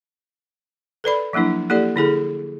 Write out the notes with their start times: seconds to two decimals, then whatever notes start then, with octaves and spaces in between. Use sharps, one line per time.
1.04 A4 B4 D5 B5
1.33 F3 F#3 A#3 D4 E4
1.70 A#3 E4 G4 A4 D5
1.96 D3 E4 G#4 A4